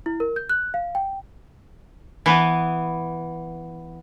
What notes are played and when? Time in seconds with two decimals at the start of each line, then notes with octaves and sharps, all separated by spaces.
0.06 E4
0.20 A#4
0.36 G6
0.49 F#6
0.74 F5
0.95 G5
2.26 E3 B3